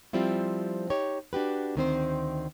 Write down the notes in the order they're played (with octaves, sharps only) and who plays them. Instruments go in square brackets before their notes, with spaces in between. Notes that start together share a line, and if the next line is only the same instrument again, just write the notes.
[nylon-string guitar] F3 G3 C4 E4 F4
D#4 G4 C#5
D4 F#4 G4 B4
D2 D#3 C4 C5